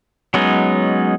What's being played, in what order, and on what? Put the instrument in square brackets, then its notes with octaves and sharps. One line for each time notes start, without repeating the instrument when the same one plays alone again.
[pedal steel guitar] F#3 G#3 B3 C#4 D#4